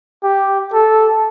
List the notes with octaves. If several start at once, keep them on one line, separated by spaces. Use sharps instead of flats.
G4
A4